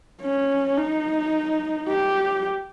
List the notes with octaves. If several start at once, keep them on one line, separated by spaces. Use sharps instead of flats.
C#4
D#4
G4